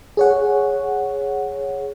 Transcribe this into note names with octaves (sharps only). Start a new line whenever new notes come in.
G#4 C#5 F#5